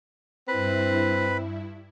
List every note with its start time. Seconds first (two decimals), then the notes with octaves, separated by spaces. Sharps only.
0.48 G2 C4 E4 B4 B5